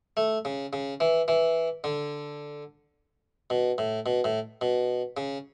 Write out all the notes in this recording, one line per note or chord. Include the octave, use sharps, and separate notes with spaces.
A3
C#3
C#3
E3
E3
D3
B2
A2
B2
A2
B2
C#3